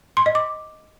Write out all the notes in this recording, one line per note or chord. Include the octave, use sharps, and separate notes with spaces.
C6
D#5
D6